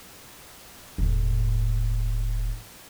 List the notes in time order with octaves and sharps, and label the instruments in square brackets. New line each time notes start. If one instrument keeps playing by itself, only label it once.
[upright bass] E1 A2